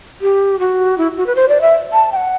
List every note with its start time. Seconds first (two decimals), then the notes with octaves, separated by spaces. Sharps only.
0.21 G4
0.59 F#4
0.98 E4
1.17 F#4
1.26 B4
1.36 C5
1.48 D5
1.61 E5
1.93 A5
2.12 G5
2.16 F#5